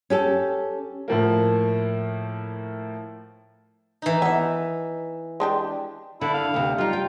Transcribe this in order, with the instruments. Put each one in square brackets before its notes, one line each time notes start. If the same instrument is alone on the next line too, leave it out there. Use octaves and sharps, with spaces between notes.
[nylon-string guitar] C#4 G4 A4
[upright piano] A2 F3 A#3
[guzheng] E3 D#4
[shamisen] B3 D#4 [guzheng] E5
[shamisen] G#3 D4 G4
[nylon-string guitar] D3 [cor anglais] E4
[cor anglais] F5
[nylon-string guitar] D2 C3
[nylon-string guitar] G3 D#4 [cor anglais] F4
[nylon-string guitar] G5